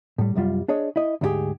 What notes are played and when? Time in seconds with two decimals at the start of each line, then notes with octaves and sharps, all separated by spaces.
0.18 A2 G3
0.35 C2 F#2 G3 F4
0.68 D4 G#4 C#5 D#5
0.96 E4 D#5
1.21 D2 G#2 D4 G4 G#4